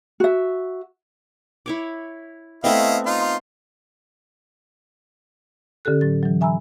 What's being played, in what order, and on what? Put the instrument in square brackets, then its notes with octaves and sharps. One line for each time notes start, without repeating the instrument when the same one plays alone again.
[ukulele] F#4 E5
[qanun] E4 C#5 D6
[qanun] A3 B3 C4 [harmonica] E4 D#5 F5
[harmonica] D#4 F4 C6
[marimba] D3 C#4 G4 A4 F#6
A2 F#3 A6
E3 F#3
E5 G#5 A#5 B5 E6